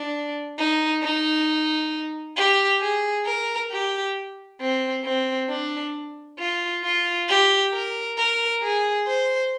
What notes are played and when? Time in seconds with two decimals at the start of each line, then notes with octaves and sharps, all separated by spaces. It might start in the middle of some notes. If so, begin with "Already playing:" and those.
Already playing: D4
0.58 D#4
1.02 D#4
2.37 G4
2.81 G#4
3.26 A#4
3.71 G4
4.60 C4
5.05 C4
5.50 D4
6.40 F4
6.84 F4
7.29 G4
7.74 A#4
8.18 A#4
8.63 G#4
9.07 C5